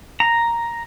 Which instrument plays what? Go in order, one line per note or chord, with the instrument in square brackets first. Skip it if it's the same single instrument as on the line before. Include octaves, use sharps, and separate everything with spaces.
[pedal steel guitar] A#5